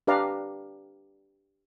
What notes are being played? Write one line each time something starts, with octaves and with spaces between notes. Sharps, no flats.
D4 G4 B4 D5 F5 A#5